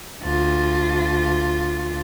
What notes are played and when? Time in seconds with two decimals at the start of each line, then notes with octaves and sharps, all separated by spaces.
0.23 D2 F4